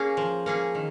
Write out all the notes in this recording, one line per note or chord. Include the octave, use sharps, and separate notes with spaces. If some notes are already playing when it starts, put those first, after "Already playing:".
Already playing: A#3 C#4 G#4
F3
A#3 C#4 G#4
D#3